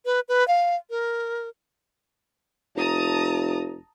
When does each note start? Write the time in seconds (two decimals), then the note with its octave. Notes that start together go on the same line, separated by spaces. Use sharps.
0.05 B4
0.29 B4
0.48 F5
0.90 A#4
2.76 F1 A5 A#5 D#6